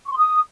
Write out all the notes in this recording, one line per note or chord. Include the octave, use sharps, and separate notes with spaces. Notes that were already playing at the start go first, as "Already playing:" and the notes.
C#6
C6
D#6